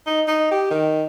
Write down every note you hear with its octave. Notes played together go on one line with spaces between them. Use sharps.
D#4
D#4
G4
D#3